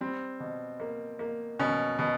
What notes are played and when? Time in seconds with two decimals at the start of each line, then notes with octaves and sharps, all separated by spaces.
0.01 G3 C4
0.40 B2
0.80 A#3
1.19 A#3
1.59 B2 C#4
1.99 B2